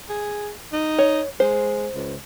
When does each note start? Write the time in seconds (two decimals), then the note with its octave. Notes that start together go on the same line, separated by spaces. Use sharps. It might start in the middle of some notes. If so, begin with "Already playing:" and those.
0.09 G#4
0.72 D#4
0.99 C#5
1.40 G#3 C5
1.95 C#2